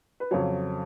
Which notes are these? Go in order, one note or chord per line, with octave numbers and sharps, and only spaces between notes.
B4
F2 C#3 F#3 C#5